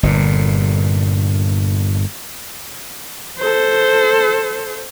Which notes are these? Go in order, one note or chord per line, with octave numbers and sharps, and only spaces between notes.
G1 A#2
A4 C5